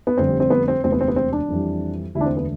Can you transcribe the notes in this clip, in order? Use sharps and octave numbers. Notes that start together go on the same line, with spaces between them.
B3
F1 F2 D3 G3 C4
C4
B3
C4
E1 D2 C3 C4
B3
C4
B3
C4
D4
F2 E3 G3
E1 D2 D3 A3 E4
D4
C4
B3